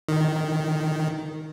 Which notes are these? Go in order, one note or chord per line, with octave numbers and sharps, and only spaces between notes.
D#3